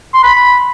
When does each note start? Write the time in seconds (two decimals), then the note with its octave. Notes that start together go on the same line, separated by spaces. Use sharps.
0.14 C6
0.23 B5